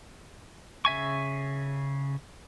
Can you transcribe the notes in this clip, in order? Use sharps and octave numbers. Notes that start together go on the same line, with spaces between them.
C#3 E5 G#5 C#6